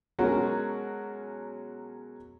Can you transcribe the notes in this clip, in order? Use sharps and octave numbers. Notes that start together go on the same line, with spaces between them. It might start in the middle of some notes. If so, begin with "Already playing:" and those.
B2 F#3 G#3 C#4 F#4 A#4